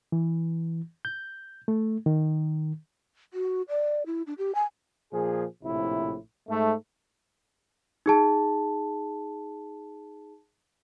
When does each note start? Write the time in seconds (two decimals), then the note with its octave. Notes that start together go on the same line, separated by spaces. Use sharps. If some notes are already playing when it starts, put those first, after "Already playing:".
0.12 E3
1.05 G6
1.68 A3
2.06 D#3
3.33 F#4
3.69 D5
4.06 E4
4.27 D4
4.38 G4
4.55 G#5
5.13 A#2 F3 G#4
5.63 A#1 A2 C3 E4
6.49 G#2 A3
8.06 D#4 G#4 A5